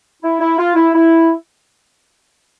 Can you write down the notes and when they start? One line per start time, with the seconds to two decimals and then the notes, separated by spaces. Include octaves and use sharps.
0.23 E4
0.40 E4
0.58 F4
0.75 E4
0.94 E4